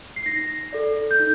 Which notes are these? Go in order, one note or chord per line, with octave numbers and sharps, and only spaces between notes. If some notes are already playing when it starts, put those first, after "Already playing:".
C7
D#4 A#6
A4 D5
G6
D#4